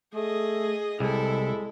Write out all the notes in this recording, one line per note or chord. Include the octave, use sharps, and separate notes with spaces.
A3 G#4 D#5
C2 G#3 E4 A4